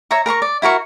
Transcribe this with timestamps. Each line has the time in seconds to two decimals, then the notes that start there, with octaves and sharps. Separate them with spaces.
0.11 C#5 E5 A#5 C#6
0.26 A#4 A#5 C6 C#6
0.42 D5
0.62 E4 F#4 A#4 C#6